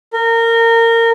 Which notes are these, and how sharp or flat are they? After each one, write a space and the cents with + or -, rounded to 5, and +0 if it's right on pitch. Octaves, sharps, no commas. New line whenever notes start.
A#4 -20